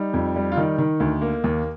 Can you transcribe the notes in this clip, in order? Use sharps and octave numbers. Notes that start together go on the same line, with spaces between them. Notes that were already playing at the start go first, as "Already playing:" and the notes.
Already playing: G3 D#4
F2
G3
F4
D#3 D#4
D#3
D2
A#3
D#2